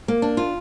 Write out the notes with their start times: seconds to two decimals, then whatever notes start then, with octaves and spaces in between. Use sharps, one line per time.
0.08 A#3
0.22 D4
0.37 F4